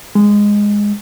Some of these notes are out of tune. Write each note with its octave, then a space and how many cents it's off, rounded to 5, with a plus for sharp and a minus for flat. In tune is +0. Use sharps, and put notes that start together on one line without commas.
G#3 -10